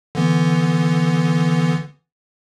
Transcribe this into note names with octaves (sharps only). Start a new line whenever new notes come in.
D3 E3 B3